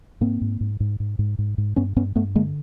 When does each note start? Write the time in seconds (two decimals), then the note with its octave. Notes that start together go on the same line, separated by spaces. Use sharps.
0.21 G#2 A#3 C4
0.41 G#2
0.61 G#2
0.80 G#2
1.00 G#2
1.19 G#2
1.38 G#2
1.58 G#2
1.76 G2 B3 C#4
1.96 G2 B3 C#4
2.16 G2 A3 B3
2.35 D3 G#3 A#3